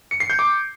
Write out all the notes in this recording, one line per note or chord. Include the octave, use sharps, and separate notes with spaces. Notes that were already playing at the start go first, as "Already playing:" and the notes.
C#7
C7
G6
D6